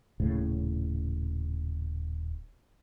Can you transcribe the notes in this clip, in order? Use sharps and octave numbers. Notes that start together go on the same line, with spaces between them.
D#1 A2 C#3